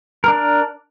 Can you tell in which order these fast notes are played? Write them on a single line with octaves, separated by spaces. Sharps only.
A#4 D4 D5